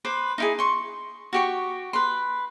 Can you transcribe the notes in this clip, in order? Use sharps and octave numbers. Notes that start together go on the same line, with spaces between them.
B4 C5 D6
D#4 E4 G#4
C6 C#6
F#4 G4 C#6
B4 C6